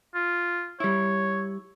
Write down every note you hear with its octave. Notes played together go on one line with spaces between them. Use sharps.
F4
G3 E4 C#5